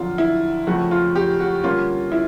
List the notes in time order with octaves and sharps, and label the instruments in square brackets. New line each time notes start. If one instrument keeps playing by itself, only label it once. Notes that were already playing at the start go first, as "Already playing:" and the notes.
Already playing: [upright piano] F2 D3 F#3 F4
E4
F2 C#3 F3 A3 F#4
F4
G4
F#4
D3 G3 A#3 C#4 F4
E4